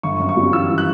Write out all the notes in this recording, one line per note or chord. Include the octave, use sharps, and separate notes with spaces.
G1 C#6
F#2
C#6
G3
E3 E6
E3
F#6